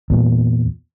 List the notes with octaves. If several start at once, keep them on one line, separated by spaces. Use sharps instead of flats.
E2 A#2